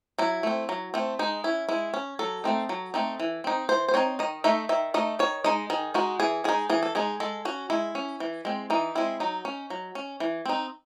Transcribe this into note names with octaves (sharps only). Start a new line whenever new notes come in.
F#3 E4
A3 C4
F#3
A3 C4
G#3 D#4
C#4 E4
G#3 E4
C#4
F#3 A4
A3 C4 D#4
F#3
A3 C4 D#4
E3
C4 D#4
E3 C5
C5
C4 D#4 C#5
D#3 D#5
A3 D#4 E5
D#3 E5
A3 D#4 D#5
D#3 C#5
G#3 D#4 D#5
D#3 G#4
G#3 D#4 F#4
E3 G#4
G#3 D#4 G#4
E3 G#4
A4
G#3 D#4 G#4
G#3 A4
C#4 F#4
G#3 E4
C#4
E3
G#3 C4
E3 D#4
G#3 C4 E4
F#3 D#4
C#4
F#3
C#4
E3
C4 D#4